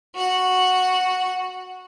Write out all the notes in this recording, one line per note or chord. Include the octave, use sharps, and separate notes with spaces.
F#4 F#5